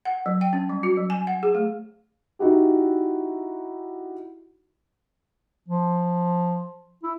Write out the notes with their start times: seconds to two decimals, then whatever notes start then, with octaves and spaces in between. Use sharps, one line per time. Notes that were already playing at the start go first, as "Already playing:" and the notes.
0.05 F#5
0.26 F#3
0.41 G5
0.53 C#4
0.69 G3
0.83 F#4
0.97 F#3
1.10 G#5
1.27 F#5
1.43 G#4
1.55 A3
2.39 D#4 E4 F#4 G4
5.68 F3
7.03 E4